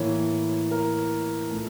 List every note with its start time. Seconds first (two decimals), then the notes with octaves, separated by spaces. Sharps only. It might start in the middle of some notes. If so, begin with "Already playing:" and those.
Already playing: A2 E3 A#3 C#5
0.71 A#4
1.51 A#2 A3